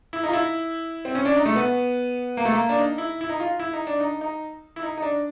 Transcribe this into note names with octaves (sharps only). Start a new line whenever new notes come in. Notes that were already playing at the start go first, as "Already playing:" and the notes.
E4
D#4
F4
E4
C4
C#4
D4
D#4
A3
B3
A#3
A3
A#3
D4
D#4
E4
E4
D#4
F4
E4
D#4
D4
D#4
D#4
E4
D#4
D#4
D4